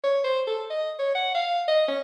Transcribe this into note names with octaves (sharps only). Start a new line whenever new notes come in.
C#5
C5
A4
D#5
C#5
F#5
F5
D#5
C#4